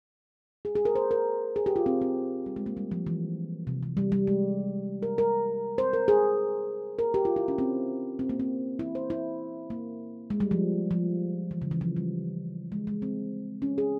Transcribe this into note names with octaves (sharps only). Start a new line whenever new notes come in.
G#4
G#4
A#4
C5
A#4
G#4
G4
F4
C4
C4
G3
G#3
A#3
G3
F3
E3
C3
E3
G3
G3
G#3
A#4
A#4
C5
A#4
G#4
A#4
G4
F4
E4
C#4
C4
C4
A#3
C4
E4
C5
E4
A#3
G#3
G3
F3
F3
E3
C#3
E3
F3
G3
G#3
G#3
C4
C#4
G#4